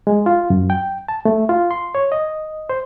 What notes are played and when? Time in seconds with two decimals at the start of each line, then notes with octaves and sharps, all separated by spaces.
0.07 G#3
0.26 F4
0.50 F#2
0.70 G5
1.08 A5
1.25 A3
1.49 F4
1.71 C6
1.95 C#5
2.12 D#5
2.70 C5